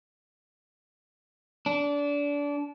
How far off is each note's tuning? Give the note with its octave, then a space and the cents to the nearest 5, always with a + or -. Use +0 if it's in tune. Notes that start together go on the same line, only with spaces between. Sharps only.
D4 -25